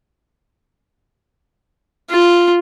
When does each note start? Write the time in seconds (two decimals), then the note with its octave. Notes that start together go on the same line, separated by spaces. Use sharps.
2.11 F4